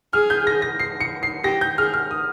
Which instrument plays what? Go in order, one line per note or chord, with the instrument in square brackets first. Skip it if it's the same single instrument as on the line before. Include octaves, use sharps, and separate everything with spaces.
[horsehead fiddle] G#4 [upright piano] F6
[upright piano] G6
A#6
A#6
C7
C#7
C7
[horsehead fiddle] G4 [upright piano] A#6
[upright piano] G6
[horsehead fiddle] G#4 [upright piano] F6
[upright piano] F6
D#6